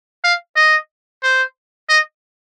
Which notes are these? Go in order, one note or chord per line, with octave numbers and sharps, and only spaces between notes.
F5
D#5
C5
D#5